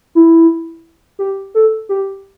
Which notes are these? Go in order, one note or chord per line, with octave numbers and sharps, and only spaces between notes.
E4
G4
A4
G4